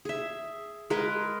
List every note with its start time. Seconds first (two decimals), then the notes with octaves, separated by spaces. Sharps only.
0.05 G#4 E5
0.90 G#3 G#4 A#4 B4